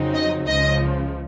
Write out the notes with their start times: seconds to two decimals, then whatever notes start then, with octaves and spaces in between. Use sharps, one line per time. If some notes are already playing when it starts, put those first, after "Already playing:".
Already playing: F2 C#3 F#3 C4 D#4
0.14 D#5
0.47 C#2 C#3 F3 D#5